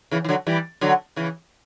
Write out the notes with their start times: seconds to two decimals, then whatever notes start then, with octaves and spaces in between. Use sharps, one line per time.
0.11 C#3 E3
0.24 E3
0.29 D3 F#3
0.47 E3 G3
0.81 D3 F#3
1.16 C#3 E3